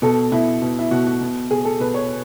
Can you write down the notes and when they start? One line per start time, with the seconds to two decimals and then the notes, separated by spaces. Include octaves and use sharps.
0.02 B2 A4
0.32 B2 E4
0.62 B2
0.79 E4
0.91 B2 F#4
1.07 F#4
1.21 B2
1.51 B2 G#4
1.65 A4
1.80 B2 B4
1.94 C#5